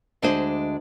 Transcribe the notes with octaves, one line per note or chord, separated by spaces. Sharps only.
D2 G#3 D4 G#4 C5 D#5